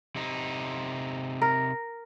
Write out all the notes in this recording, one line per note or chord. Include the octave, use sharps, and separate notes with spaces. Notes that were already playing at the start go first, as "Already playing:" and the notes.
C3 D#4
A#4